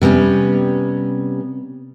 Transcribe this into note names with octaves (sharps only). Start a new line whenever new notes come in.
C3 G3 B3 C#4